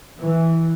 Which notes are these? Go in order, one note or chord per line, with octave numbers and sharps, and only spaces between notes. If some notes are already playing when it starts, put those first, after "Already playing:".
E3